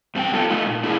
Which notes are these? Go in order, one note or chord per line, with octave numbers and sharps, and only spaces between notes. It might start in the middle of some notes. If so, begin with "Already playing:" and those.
G2 C4 G#4 G5
B3 D#4 F4 A4
A3 D#4 F4
A#2
D4 E4 G#4 A#4